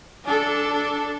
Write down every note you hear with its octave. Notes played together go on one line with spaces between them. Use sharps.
D4 A4